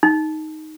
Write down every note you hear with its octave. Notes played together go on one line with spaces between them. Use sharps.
D#4